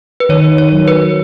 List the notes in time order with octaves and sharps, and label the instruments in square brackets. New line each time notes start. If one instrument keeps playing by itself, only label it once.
[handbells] B4
[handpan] D#3 [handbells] C#5
[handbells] C#5
[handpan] F#3
[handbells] B4